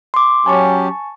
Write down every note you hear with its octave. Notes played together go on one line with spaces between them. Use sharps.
C6 D6
F#3 C#4 G4 G#5 A5 C#6